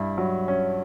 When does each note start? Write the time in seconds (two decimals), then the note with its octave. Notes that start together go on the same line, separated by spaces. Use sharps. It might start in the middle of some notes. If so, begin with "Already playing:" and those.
Already playing: G2 E4
0.18 F#3
0.48 C#4